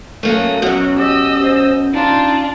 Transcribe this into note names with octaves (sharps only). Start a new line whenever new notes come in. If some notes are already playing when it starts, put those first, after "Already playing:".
F#3 A3 A#3 C#4 D#6
F#2 B2 F#3 C#4 F#4
G4 D#5 E6
C5
D4 D#4 F4